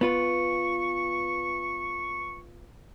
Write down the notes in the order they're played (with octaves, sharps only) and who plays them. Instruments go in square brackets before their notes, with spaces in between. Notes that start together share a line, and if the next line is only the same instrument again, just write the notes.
[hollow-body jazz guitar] B3 F4 B4 [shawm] C#6